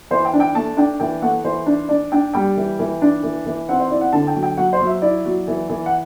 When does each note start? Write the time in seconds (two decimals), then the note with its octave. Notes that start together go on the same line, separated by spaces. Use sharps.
0.11 E3 C5
0.25 G5
0.33 D4
0.40 G5
0.55 A3 A5
0.77 D4 G5
1.00 E3 G5
1.22 A3 F#5
1.44 E3 C5
1.66 D4
1.89 D4 D5
2.12 D4 G5
2.34 G3 G5
2.57 E3
2.79 E3
3.02 D4
3.23 E3
3.46 E3
3.69 C4 F#5
3.80 C5
3.91 E4 D5
4.01 F#5
4.13 D3 A5
4.27 G5
4.35 F#3
4.43 G5
4.57 F#3 F#5
4.73 C5
4.81 F#3
4.87 E5
5.02 E4 D5
5.25 F#3
5.48 E3
5.70 E3
5.86 F#5